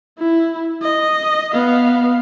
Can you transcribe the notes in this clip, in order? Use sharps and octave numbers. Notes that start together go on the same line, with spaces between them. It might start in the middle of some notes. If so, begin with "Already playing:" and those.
E4
D#5
B3 F5